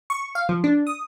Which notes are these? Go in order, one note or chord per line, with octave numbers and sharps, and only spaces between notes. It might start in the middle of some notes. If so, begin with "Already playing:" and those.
C#6
F5
F3
D4
D#6